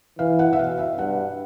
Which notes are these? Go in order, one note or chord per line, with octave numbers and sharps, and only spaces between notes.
E3 F5
F#5
E5
B2 F5
E5
G2 F#5